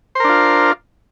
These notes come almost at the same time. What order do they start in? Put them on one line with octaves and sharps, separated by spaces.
C5 A#4 D4 F4